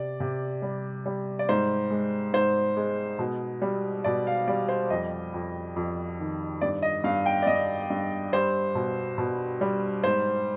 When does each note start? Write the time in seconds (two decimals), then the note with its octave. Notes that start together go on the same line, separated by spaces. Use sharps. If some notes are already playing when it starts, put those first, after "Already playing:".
Already playing: C3 D5
0.20 C3
0.62 G3
1.06 G3
1.39 D5
1.49 G#2 C5
1.91 G#3
2.33 G#2 C5
2.77 G#3
3.19 B2
3.62 G3
4.04 B2 D5
4.27 F5
4.48 G3 D5
4.69 C5
4.90 F2 D#5
5.34 F2
5.76 F2
6.19 D#3
6.61 G2 D5
6.82 D#5
7.04 G2 F5
7.26 G5
7.43 D5
7.47 G2 D#5
7.90 G2
8.33 G3 C5
8.75 B2
9.18 B2
9.61 G3
10.04 G#2 C5